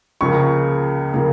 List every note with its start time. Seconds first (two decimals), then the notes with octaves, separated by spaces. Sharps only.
0.21 C#2 C#3 F3 A#3 C#6
1.14 C#3 F3 A#3